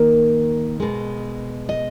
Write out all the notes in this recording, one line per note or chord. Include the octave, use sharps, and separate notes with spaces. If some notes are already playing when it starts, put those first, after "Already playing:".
Already playing: D#3 A#3 A#4
B2 G#3
D#5